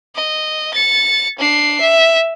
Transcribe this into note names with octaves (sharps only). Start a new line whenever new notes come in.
D#5
A6 C#7
D4 C7
E5